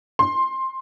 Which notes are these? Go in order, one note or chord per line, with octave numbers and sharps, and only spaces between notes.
C6